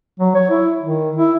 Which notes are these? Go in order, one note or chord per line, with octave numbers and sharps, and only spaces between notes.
F#3
C#5
E4
D#3
E4